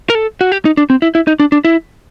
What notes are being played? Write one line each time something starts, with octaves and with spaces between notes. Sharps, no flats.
A#4
A4
F#4
G4
D#4
D4
C4
E4
E4
D#4
D4
D4
E4